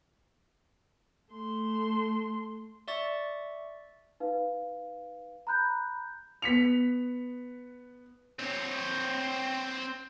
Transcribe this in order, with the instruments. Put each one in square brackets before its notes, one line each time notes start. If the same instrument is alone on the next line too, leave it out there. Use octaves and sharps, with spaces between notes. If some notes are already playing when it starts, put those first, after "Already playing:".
[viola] A3 C6
[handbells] D5 E5 C#6 A6
[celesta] D#4 B4 F5
A#5 B5 F#6 G6
[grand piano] B3 B6 C#7 F7
[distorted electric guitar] C4 C#5